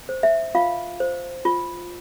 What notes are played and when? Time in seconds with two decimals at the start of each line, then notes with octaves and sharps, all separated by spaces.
0.09 C5
0.23 E5
0.55 F4 F5
1.00 C5
1.45 F4